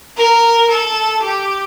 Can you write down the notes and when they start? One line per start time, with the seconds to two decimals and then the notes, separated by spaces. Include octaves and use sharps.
0.17 A#4
0.70 A4
1.23 G4